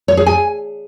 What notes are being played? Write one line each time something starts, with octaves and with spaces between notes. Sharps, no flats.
C#5
G#4
G#5